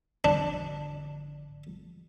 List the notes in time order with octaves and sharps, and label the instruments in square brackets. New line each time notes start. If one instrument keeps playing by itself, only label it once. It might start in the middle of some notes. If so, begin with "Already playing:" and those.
[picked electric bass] G#1 D3 F3 [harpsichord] D4